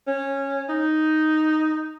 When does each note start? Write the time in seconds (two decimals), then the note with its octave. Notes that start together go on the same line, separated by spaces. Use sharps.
0.08 C#4
0.69 D#4